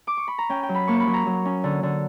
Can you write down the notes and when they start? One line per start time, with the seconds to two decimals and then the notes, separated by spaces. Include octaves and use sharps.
0.07 D6
0.17 C#6
0.28 B5
0.38 A#5
0.50 C#4 G5
0.63 G5
0.69 F#3
0.74 B5
0.87 A#3 C#6
1.00 B5
1.07 F#3
1.14 A#5
1.26 F#3
1.45 C#4
1.64 D3
1.83 D3